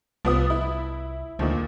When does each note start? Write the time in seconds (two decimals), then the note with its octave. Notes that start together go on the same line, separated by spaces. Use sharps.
0.25 C2 F3 B3 D#6
0.50 E4
1.39 D2 A#2 D#3 F3